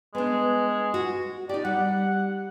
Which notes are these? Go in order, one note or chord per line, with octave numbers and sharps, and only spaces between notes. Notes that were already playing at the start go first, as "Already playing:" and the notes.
G#3 B3 D4
F#4
D#4 G4 D5
G3 F#5